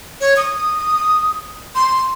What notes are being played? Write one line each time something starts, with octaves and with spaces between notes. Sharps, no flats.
C#5
D#6
C6